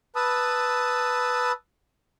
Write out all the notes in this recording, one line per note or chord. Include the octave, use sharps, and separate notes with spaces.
B4 A5 B5 D#6 E6